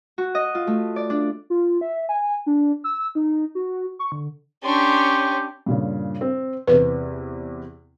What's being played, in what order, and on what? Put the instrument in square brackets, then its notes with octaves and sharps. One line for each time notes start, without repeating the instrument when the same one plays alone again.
[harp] F#4
D#5
F4
A3
D5
D4
[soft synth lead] F4
E5
G#5
D4
E6
D#4
F#4
C#6
D3
[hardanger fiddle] C#4 D4 [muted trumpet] G4 [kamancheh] C6 C#6
[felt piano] G2 A#2 C#3
C4
[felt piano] E2 C3 [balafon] B4